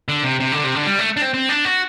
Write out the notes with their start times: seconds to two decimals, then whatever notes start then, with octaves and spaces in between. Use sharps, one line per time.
0.09 D3
0.24 C3
0.40 C3
0.52 D3
0.64 C3
0.75 D3
0.87 G3
0.99 A3
1.17 D4
1.22 C4
1.34 C4
1.49 D4
1.65 F#4